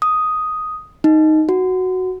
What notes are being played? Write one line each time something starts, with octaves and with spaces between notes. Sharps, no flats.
D#6
D#4
F#4